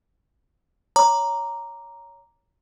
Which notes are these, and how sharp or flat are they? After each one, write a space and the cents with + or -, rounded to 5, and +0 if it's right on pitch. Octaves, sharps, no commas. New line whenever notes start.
C#5 +15 A#5 +0 D6 +0